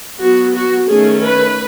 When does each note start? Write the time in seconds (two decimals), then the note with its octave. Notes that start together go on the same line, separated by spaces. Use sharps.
0.21 F#3 B3 F#4
0.54 F#4
0.88 D#3 A3 C#4 G#4
1.23 B4